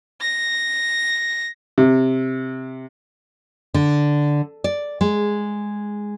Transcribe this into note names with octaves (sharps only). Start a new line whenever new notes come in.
A#6
C3
D3
D5
G#3